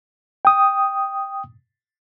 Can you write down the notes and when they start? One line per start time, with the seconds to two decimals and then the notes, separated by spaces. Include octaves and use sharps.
0.45 G5 D#6